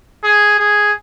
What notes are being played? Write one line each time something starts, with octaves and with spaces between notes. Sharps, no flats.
G#4
G#4